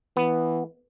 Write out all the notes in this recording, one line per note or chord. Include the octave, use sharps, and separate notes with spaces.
E3 B3